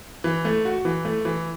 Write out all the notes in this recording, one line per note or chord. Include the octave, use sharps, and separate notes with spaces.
E3
A3
F#4
E3
A3
E3